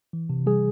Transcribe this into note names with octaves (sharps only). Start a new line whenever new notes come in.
E3
C3
G3 G#4